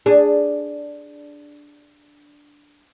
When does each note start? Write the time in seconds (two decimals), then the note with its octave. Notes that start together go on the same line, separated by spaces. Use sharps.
0.06 D4 G#4